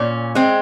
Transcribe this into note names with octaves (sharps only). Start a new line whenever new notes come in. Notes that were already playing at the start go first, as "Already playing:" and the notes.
Already playing: A#2 C#4
G#3 C4